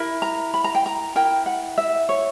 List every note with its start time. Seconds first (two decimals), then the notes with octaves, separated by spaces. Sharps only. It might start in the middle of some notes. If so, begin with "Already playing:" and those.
Already playing: E4 A#4
0.22 A#5
0.54 B5
0.64 A#5
0.75 G5
0.86 A#5
1.15 E4 A#4 G5
1.46 F#5
1.78 E5
2.09 C#5